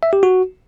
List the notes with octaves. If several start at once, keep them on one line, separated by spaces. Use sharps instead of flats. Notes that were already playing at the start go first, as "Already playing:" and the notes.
E5
G4
F#4